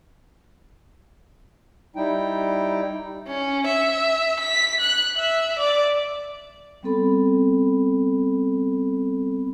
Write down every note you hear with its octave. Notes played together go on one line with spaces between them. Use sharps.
G3 D#4 E4 G5
C#4
E5
B6
F#6
E5
D5
G3 B3 C4 A4 B5